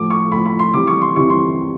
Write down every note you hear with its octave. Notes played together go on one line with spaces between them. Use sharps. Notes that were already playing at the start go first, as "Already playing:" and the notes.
Already playing: A2 F3 D6
C#6
A2 F3 B5
B5
C6
C3 E3 G3 D6
C#6
C6
C3 E3 G3 C#6
C6